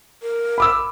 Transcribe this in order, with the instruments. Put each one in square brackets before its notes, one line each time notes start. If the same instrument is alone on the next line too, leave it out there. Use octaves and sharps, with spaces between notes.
[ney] A#4
[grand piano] B5 D6 E6